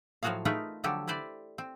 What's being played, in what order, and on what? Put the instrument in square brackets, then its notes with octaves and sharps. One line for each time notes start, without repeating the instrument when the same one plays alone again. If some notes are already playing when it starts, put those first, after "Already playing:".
[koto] A2 F3 F#3 F#4 G#4 F5
A3 D#4 F4 G#4 A#4 B4
D3 F3 F#3 G4 A4
E4 B4 C5 D5
C4